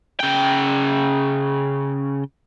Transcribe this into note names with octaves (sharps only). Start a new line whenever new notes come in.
C#3 G5